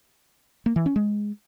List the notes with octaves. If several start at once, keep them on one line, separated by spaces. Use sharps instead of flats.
A#3
E3
C#4
G#3